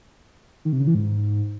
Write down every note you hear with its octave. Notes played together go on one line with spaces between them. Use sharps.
D#3
C3
C#3
E3
G#2